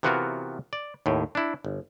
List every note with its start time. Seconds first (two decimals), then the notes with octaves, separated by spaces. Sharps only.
0.03 C3 E3 B3 F4 F#4 A#4
0.73 D5
1.06 D#2 A2
1.35 D4 E4
1.65 G1